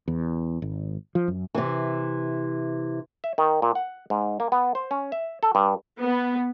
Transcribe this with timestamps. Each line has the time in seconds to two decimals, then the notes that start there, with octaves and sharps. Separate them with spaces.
0.08 E2
0.62 G#1
1.15 F3
1.28 F#2
1.55 C3 E3
3.24 E5
3.38 D#3
3.62 A#2
3.75 F#5
4.10 G#2
4.40 A#3
4.52 B3
4.75 C5
4.91 C#4
5.12 E5
5.43 A4
5.55 G2
6.01 B3